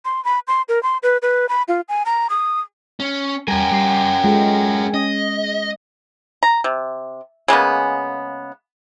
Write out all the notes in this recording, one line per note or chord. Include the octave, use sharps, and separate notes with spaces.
C6
B5
C6
A#4
C6
B4
B4
B5
F4
G#5
A#5
D#6
C#4
E2 G3 C#4 A#4 G5 G#5
G3 D6 C7
G#3 F4 A4
C#4 D#5 D#6
A#5
C3
C#3 G#3 A#3 B3